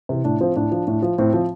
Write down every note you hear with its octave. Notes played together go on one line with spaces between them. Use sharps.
C3 E3
A2 D4
F3 C4
A2 D4
F3
A2
F3
A2 C4
F3